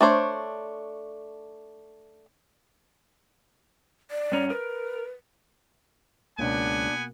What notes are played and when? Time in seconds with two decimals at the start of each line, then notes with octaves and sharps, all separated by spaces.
0.01 A3 D4 C5 C#5
4.11 D5
4.32 G2 C#4 A#5
4.50 A#4 B4
6.39 C#2 B2 A#3 B3 D4 F#5 G#5